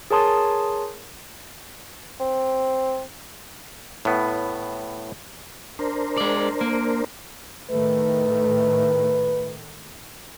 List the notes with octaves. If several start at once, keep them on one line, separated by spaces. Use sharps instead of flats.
G#4 A#4 C#5 A5 C6 D#6
C4
A2 B3
D4 A#4 C5
G#3 D5
A#3
A2 D#3 A3 B4